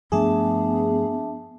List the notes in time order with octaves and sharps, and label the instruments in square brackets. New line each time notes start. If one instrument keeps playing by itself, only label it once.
[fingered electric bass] G2 F3 A3 [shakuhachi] B3 [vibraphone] D4 E5 A5 [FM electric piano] G#4